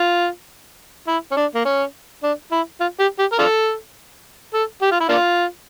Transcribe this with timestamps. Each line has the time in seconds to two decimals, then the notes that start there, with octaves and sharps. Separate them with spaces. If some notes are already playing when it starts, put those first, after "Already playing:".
Already playing: F4
1.08 E4
1.32 C#4
1.37 D4
1.55 A#3
1.65 C#4
2.23 D4
2.52 E4
2.80 F4
3.00 G4
3.19 G4
3.32 A#4
3.39 D4 F4 A4
4.54 A4
4.82 G4
4.91 F4
5.00 E4
5.09 A#3 D4 F4